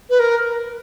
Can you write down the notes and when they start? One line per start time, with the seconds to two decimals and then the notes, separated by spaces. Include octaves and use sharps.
0.10 B4
0.20 A#4